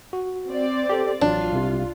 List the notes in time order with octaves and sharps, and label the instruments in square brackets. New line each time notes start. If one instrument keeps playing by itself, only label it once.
[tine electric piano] F#4
[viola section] C4 D5
[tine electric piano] G4 A4 C5
[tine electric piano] A1 F#3 [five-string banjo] D4 [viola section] F4
[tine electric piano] C2 C3